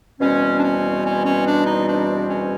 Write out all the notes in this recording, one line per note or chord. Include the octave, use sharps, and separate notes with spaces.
E2 B2 G3 C4 C#4
D4
C#4
C#4
C#4
D4
D#4
D4
C#4